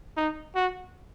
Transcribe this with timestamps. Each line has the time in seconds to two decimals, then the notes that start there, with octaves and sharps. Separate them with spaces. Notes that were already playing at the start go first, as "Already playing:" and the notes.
0.17 D#4
0.55 F#4